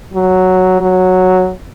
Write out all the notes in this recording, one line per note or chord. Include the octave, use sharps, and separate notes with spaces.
F#3
F#3